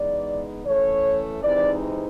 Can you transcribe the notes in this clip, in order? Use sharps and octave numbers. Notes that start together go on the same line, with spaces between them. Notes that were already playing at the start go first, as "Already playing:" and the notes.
Already playing: E3 G#3 B3 D#4 D5
E3 A3 C#4 C#5
C3 E3 G#3 C4 D#4 D5